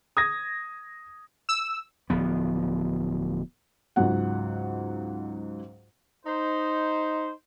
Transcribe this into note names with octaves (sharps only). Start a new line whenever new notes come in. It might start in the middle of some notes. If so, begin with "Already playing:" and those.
D#6 G#6 A#6
E6
D1 F3 B3
C#2 G#2 F#3 F#5
D#4 C5